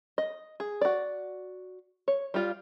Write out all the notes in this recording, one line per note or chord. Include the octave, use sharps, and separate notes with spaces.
D#5
G#4
F#4 D5
C#5
G3 F4